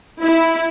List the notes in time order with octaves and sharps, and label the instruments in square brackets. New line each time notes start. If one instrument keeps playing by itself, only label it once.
[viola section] E4